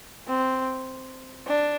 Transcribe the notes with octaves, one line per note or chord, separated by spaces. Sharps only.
C4
D4